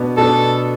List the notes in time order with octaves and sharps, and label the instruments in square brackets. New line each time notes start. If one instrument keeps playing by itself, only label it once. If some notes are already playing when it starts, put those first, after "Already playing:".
Already playing: [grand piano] B2 B3 D4
[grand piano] B2 B3 D4 [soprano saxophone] A4